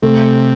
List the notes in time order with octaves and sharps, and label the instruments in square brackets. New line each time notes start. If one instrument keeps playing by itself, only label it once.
[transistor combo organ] C3 [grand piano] A3